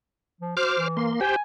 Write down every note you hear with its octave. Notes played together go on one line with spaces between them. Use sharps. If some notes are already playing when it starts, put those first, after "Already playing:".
F3
F#4 C5 D6 F6
E3
A#3 C6
G4 C5 G5 G#5